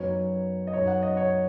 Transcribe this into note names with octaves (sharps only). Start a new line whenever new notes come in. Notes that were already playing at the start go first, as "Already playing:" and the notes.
Already playing: F#2 F#3 B3 D#4 C#5
D#5
F#2 F#3 B3 D#4 C#5
F#5
D#5
C#5